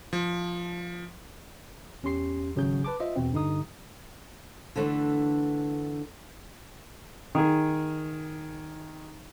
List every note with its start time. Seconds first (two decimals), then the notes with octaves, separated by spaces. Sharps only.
0.13 F3
2.03 E2 C#4 G4 C6 C7
2.56 G#1 C#3 F#3 C#4 G#4 G6
2.85 B4 A5 D6
3.00 F4 C5 D#5 E5
3.16 E2 B2 C4
3.32 G2 D3 D#4 D#6
4.76 D3 E3 A3 D4
7.35 D#3 G#4